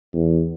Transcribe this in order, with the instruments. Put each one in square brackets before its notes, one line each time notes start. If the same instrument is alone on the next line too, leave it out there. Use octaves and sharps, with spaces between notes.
[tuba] E2